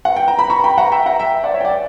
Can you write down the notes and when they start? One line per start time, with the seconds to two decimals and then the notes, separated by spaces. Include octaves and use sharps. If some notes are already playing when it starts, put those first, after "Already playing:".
0.05 F#5
0.16 G5
0.28 A#5
0.39 B5
0.50 A#5 C#6
0.64 G5 B5
0.78 F#5 A#5
0.92 E5 G5
1.06 F#5 A#5
1.19 E5 G5
1.44 D5 F#5
1.54 C#5 E5
1.61 G5
1.65 D5 F#5